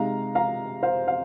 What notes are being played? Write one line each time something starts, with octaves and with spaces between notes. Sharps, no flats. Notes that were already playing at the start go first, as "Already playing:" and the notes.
Already playing: C3 G#3 D#4 F5 A#5
F5 A#5
C5 F5
F5